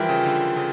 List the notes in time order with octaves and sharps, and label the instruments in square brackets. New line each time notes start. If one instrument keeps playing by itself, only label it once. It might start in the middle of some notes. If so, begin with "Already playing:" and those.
Already playing: [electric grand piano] E3 F3 G3 [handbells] F4 A#4 E5 G5
[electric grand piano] C#3
D3
C#3